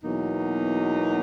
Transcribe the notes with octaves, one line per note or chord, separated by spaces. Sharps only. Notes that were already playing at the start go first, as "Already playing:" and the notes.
E2 B2 F#3 A#3 D#4